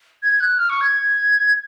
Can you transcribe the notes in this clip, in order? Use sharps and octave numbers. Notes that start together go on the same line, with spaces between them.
G#6
F#6
F6
C#6
G#6